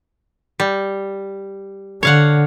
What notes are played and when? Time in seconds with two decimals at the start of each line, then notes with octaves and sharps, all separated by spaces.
0.60 G3
2.03 D3 C#5 F5 F#5